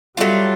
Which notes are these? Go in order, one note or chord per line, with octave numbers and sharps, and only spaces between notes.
F#3 G3 A3 D4 F4